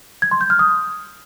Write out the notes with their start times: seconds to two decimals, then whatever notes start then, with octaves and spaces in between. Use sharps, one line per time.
0.22 G#6
0.31 C6
0.41 G6
0.50 F6
0.59 D#6